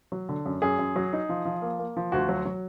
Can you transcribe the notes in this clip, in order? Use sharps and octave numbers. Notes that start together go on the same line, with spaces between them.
F#3
D3
F#2
F#2 G#4
F#2
F#3
D#4
F3
F3
A#3
A#3
F3
D2 F#4
F#3
F#3